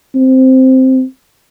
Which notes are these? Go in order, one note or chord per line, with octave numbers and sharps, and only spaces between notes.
C4